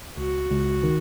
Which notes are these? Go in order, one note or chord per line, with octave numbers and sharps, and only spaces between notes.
C#2 F#4
C#2
D#3